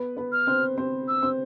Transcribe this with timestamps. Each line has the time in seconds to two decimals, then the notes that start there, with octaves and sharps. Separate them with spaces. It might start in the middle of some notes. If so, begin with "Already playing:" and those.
Already playing: B3 B4
0.17 B3 B4
0.32 F6
0.47 C4 C5
0.78 C4 C5
1.08 E6
1.22 C4 C5